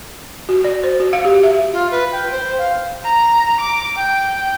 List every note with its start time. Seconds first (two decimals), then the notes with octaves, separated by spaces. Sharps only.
0.49 F#4
0.64 D5
0.84 C5
1.00 F#4
1.13 F5
1.25 G4
1.43 E5
1.73 F4
1.91 B4
2.12 G5
2.31 C5
2.58 F5
3.04 A#5
3.60 D6
3.97 G5